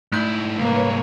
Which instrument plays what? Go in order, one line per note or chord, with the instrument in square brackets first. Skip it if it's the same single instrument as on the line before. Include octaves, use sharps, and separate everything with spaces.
[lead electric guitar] G#2 E4 [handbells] A3 D#4 G6
[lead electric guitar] C2 G#2 [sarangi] A#3 [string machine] B4 C#5